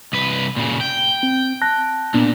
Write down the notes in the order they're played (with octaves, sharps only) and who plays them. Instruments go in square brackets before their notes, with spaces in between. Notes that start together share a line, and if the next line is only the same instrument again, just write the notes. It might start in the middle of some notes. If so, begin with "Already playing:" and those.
[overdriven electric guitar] C2 B4
A#2 C#3
G5
[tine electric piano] C4
A5 F#6 A#6
[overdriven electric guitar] A#2 [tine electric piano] B3 D4